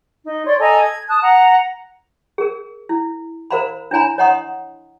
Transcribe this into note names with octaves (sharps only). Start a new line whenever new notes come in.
D#4
C#5 D5 C6
A4 D#5 G#5 A#5
G#6
A5 D#6 F#6
F#5 A#5
G#4 A#4
E4
A#4 C5 F5 A#5 B5
D4 E4 C#5 G#5 A#5 B5
C#5 D#5 F#5 A#5 C6 D#6